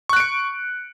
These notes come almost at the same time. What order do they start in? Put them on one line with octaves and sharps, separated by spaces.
C#6 F#6 D7 C#7